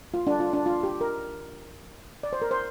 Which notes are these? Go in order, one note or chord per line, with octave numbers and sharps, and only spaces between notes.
F4
D4
F4
D4
F4
G4
A#4
D5
C5
A#4
C5